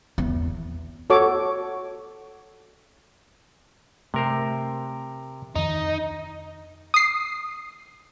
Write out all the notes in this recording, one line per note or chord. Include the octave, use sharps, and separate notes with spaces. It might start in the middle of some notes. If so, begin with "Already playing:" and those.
E2
F#4 A4 C#5 D6
C3 A3 A#4 C5
F2 D#3 D#4
D#6 C7